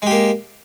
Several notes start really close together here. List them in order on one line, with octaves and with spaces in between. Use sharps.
G#3 G4 A#3